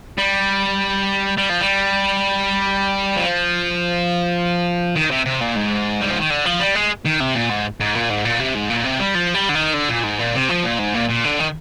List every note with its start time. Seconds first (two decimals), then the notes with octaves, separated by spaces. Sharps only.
0.18 G3
1.37 G3
1.49 F3
1.60 G3
3.17 F3
4.96 D#3
5.11 C3
5.26 C3
5.41 A#2
5.56 G#2
6.02 G3
6.11 F3
6.21 D#3
6.31 D3
6.46 F3
6.60 G3
6.75 G#3
7.05 D#3
7.20 C3
7.35 A#2
7.50 G#2
7.80 G#2
7.95 A#2
8.10 G#2
8.25 A#2
8.40 C3
8.55 G#2
8.70 A#2
8.84 C3
8.99 G3
9.15 F3
9.34 G3
9.49 D3
9.55 D#3
9.74 D3
9.89 A#2
10.04 G#2
10.19 A#2
10.35 C3
10.49 F3
10.64 A#2
10.79 G#2
10.94 A#2
11.09 A#2
11.24 D3
11.39 D#3